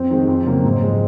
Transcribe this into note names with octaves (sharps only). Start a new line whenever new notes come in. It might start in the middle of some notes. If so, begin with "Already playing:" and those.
Already playing: F2 C4
D#3 G#3
F2
C#3 F#3 A#3
G#2
F3 G#3